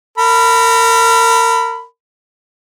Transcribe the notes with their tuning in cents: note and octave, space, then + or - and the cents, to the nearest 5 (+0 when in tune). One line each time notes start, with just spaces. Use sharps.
A#4 -30 B5 +0